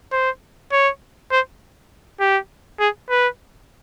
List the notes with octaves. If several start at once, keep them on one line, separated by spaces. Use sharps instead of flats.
C5
C#5
C5
G4
G#4
B4